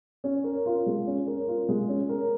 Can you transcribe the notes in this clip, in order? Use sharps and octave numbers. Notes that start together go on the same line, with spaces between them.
C#4
A#4
F4
G#3
C#4
A#4
F4
G#3
C#4
A#4